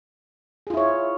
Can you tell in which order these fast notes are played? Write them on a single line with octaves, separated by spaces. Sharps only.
G#4 F4 E4 C#5